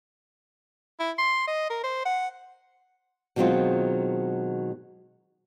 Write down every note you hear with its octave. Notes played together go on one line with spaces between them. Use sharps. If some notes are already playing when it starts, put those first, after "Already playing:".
E4
C6
D#5
A#4
C5
F#5
B2 D#3 F#3 G#3 C4 F4